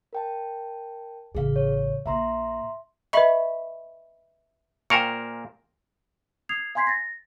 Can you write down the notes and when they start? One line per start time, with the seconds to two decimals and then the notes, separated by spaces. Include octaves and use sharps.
0.13 A#4 G5 A5
1.35 A1 C#3 G#4 F5
1.56 C#5
2.06 A#1 A#2 E5 A#5 C6
3.13 B4 D#5 E5 B5 C#6
4.90 A#2 A#4 C5 G5 G#5 C#6 C#7
6.49 D#6 G#6 C7 F7
6.75 F5 G#5 C6 G#6 B6 C7
6.87 A6 A#6